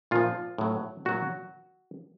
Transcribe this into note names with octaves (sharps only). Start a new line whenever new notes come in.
A#2 F3 F4
A2 F#3
A#2 F#3 F#4